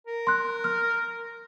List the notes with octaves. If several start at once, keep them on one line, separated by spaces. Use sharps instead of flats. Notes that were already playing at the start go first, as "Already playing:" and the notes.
A#4
C6 F#6
F6